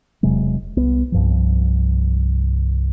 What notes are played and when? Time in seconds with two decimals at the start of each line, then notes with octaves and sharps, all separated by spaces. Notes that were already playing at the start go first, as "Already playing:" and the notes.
0.23 E1 C3 F#3 G#3
0.76 C2 B3
1.12 C2 G2 F3